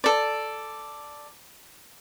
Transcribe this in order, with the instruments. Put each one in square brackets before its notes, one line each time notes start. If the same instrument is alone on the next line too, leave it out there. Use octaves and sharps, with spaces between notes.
[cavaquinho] A4 D5